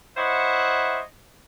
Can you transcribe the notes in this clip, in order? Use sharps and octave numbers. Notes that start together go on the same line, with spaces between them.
E4 C5 C#5 D#5 E5 F#5